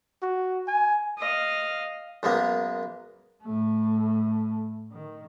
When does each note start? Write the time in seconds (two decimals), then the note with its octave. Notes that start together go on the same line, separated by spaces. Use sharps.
0.22 F#4
0.68 G#5
1.18 D#5 F5
2.23 F#2 G#3 A#3 B3
3.43 A2 A3
4.92 D#3